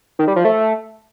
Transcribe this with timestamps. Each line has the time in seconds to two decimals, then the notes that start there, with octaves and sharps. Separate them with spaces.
0.19 D#3
0.28 G3
0.36 F3
0.45 A3